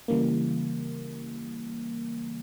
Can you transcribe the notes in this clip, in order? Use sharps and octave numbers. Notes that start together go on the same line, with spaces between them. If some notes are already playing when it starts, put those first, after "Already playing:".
C#3 E3 G3 A#3